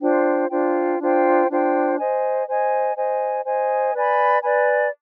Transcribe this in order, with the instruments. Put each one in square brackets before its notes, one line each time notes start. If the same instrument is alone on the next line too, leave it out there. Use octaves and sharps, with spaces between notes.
[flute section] D4 F4 C5 G5
D4 F4 C5 G5
D4 F4 C5 G5
D4 F4 C5 G5
C5 D#5 G#5
C5 D#5 G#5
C5 D#5 G#5
C5 D#5 G#5
B4 D5 G#5 B5
B4 D5 G#5 B5